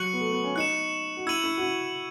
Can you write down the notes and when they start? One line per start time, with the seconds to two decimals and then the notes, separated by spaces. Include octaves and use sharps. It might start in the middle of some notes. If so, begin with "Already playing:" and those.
Already playing: F#3 C#6 F#6 C#7 F#7
0.13 B3
0.20 A3
0.32 B3
0.44 C#4
0.56 D#4 F#6 C#7 E7
1.17 F#4
1.26 E4 E6 G#6 D#7 F#7
1.44 E4
1.57 F#4
1.61 E4